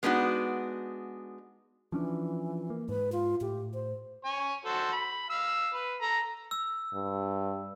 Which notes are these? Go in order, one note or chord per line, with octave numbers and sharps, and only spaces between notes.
G#3 B3 D4 D#4 F#4
E3 F3 C#4 D4
A#3
G#2 B4
F4
A2 G4
C5
C#5 G#5
F#4 A4 C5
B5
F5 E6
B4
A4 A#5
E6
G2